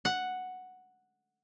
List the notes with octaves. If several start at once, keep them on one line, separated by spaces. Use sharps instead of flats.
F#5